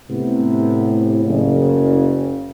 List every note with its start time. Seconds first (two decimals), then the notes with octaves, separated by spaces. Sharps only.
0.10 A2 C3 B3
1.27 F#1 C#3